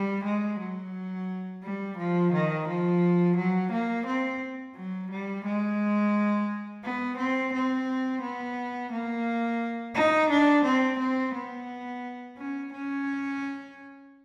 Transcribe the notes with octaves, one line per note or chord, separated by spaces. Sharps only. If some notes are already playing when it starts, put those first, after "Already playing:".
Already playing: G3
G#3
F#3
G3
F3
D#3
F3
F#3
A#3
C4
F#3
G3
G#3
B3
C4
C4
B3
A#3
D#4
D4
C4
C4
B3
C#4
C#4